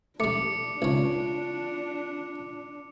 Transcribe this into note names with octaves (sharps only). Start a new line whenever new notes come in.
G3 A3 D4 D6 C#7
C#2 C#4 F4